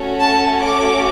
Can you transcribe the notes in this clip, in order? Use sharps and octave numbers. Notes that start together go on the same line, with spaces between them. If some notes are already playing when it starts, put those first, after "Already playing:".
Already playing: A3 C#4 F#4 A4
A5
D6